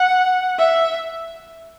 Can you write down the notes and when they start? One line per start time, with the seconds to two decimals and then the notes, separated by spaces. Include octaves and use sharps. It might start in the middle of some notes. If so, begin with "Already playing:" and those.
Already playing: F#5
0.58 E5